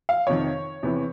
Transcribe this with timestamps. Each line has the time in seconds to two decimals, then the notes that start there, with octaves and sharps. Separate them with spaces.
0.09 F5
0.27 F2 C3 D#3 C#5
0.83 E2 C3 E3